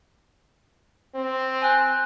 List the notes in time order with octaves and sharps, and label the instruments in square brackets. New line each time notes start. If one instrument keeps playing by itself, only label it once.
[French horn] C4
[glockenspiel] G#5 F#6 G6